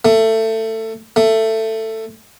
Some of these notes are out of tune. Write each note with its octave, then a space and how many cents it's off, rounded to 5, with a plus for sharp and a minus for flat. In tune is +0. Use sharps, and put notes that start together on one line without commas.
A3 +20
A3 +15